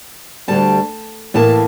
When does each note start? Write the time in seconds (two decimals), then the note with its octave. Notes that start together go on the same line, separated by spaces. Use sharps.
0.48 D2 D3 G3 A5
1.34 A2 E3 A#3 A5